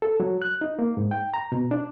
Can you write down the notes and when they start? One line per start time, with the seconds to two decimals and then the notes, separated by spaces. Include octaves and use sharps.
0.02 A4
0.20 F#3
0.42 F#6
0.61 D#4
0.79 A#3
0.97 G#2
1.11 G5
1.34 A#5
1.52 B2
1.71 D4